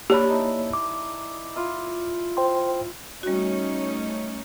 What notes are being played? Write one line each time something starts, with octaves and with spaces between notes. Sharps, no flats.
A#3 D4 G4 C#5 B5
D#4 E4
D6
E4 F4
C5 G5 C6
G3 A3 C#4 D#4 F#4